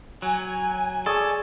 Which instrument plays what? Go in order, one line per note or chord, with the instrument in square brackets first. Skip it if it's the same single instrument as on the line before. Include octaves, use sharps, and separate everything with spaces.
[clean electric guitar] F#3 [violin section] G#5
[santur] G#4 D5 C#6 [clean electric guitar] A4